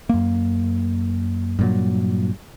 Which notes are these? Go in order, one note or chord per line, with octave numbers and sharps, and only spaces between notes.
F#2 A#3
G2 A#2 F#3